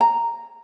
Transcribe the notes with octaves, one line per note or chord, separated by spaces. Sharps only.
A#5